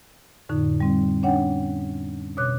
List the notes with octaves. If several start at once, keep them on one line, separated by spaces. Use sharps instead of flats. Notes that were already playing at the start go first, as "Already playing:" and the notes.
F2 A2 D3 D#4
G3 C4
C#4 D4 C#5 F#5 G5
B2 C#5 D6 F#6